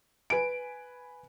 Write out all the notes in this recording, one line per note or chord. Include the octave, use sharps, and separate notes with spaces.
B4 G#5 D7